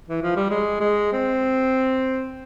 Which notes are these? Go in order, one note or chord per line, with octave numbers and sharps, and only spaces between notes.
E3
F3
G3
G#3
G#3
C4